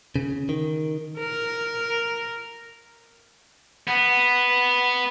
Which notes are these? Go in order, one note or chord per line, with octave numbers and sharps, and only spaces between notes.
C#3
D#3
A#4
B3